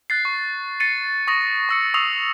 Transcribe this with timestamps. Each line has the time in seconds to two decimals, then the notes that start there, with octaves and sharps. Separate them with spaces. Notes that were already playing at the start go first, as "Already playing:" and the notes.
0.10 F#6 A6 C7
0.25 C#6
0.80 A6 C7 C#7 D#7
1.27 C#6 D#6 A#6
1.69 C#6 E6 C#7
1.94 C#6 D#6 E6 A6 C7 F7